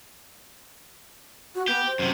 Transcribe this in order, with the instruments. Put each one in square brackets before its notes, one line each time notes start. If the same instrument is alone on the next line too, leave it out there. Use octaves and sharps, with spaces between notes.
[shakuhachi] F#4
[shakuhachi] B3 [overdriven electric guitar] G4
[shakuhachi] C5
[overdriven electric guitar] F#2 C3